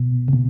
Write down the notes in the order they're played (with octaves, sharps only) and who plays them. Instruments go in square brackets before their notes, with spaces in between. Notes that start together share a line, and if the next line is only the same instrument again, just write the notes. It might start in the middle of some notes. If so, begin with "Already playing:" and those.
Already playing: [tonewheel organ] B2
C3
B2